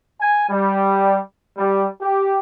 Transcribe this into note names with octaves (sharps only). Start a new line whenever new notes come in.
G#5
G3
G3
G4